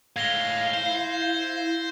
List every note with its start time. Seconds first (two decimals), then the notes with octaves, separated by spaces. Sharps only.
0.16 A2 G#3 F5 G#6 A#6 G7
0.74 E4 C5